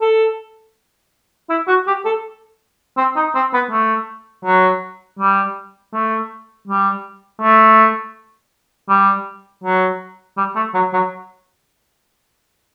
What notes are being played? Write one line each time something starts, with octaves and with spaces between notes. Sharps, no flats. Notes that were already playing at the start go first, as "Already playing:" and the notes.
A4
E4
F#4
G4
A4
C4
D#4
C4
B3
A3
F#3
G3
A3
G3
A3
G3
F#3
G3
A3
F#3
F#3